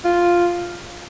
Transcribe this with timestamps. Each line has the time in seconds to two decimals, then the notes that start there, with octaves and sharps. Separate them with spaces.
0.05 F4